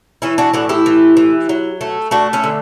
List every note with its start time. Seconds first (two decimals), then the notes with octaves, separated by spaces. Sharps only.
0.22 E3 C#4 E4
0.38 D4 F#4
0.53 A2 D4 F#4
0.69 E4 G4
0.86 E3
1.17 E3
1.49 F#3
1.81 A3
2.11 A3 D4 F#4
2.33 C#4 E4
2.44 D3